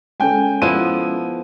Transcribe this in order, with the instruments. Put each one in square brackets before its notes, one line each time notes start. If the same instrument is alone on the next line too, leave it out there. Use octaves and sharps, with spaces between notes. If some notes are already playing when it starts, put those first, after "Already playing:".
[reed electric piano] G#3 C#4 A4 [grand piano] G5 G#5
[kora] F3 B3 E4 [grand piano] D#7